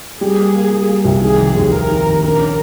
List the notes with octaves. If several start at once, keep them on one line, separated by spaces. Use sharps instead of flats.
G3 G#4
A#3
A#3
G3
A#3
C2
D#3 G#4
F1
D#2
D#2 A#4
D#3
D#2
A#1 A#4
C#4